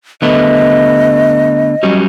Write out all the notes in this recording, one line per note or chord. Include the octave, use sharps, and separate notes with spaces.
D3 A3 B3 D#5
F#3 G3 C#4